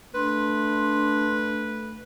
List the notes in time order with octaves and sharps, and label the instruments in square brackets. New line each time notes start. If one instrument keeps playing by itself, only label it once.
[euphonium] A3 [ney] D4 [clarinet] B4 [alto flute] C6